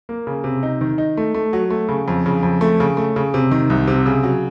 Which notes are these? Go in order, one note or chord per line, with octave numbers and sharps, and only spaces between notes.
A#3
C#3
C3
D#4
D#3
D#4
A3
A3
F#3
A3
C#3
F2
C#3
F2
A3
C#3
A3
C#3
C3
D#3
C2
C3
C#3
F#3